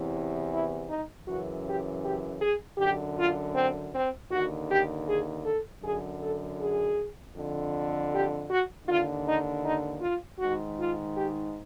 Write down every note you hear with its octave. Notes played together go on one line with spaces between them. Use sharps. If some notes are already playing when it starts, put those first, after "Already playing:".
Already playing: E2 C3 E3
E4
D#4
F#2 C#3 E3 F#4
G4
G4
G#4
F#2 D3 G4
F4
C4
C4
D#2 D3 F#4
G4
G#4
A4
F#2 D3 G#4
A4
G#4
F2 D3
G4
F#4
D#2 D3 F4
D#4
D#4
F4
G#2 D#3 F#4
F4
G4